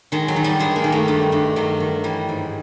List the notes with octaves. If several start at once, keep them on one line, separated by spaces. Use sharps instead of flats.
D#3 G#3
F#3
D#3
G3
G2 G#3
A#3
D#3
A3
G2 G3
G2
D#3 F#3
D#3
E3 G3
G#2